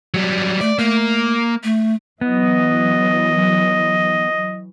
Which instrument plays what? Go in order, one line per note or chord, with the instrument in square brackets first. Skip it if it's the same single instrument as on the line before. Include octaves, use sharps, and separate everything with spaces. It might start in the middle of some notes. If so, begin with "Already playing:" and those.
[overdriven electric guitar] F#3 G3
[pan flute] A3 [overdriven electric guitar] D5
[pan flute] A3 [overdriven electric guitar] A#3
[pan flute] A3
[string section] E3 F#3 [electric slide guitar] B3 [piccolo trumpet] D#5